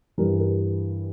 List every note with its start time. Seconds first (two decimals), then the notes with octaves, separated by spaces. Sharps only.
0.18 G2 E3 G3 A#4
0.39 A#4